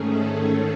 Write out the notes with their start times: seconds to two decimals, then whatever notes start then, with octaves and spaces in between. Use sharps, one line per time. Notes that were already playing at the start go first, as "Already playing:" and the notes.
Already playing: G#2 D#3 A3 C#4 G#4
0.09 A4